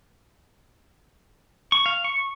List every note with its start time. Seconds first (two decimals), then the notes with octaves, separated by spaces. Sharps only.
1.72 C#6
1.86 F5
2.04 C#6